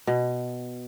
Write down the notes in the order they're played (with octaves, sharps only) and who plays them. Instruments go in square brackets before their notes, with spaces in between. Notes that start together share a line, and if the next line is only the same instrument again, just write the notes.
[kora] B2